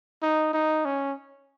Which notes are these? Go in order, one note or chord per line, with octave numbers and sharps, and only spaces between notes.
D#4
D#4
C#4